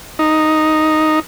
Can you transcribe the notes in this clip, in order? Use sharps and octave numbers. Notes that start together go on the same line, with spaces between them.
D#4